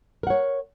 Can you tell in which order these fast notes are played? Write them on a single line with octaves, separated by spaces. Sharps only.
A#4 F#5 C#5